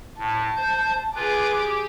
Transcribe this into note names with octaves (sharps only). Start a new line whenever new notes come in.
A2 A5
C5 G6
F4 G#4 B4 D6
G4